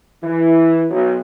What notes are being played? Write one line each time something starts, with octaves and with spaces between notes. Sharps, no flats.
E3
B1